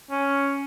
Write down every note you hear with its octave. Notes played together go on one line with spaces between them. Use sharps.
C#4